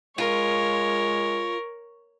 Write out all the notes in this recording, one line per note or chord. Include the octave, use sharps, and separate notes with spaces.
G#3 F4 A#4 C#5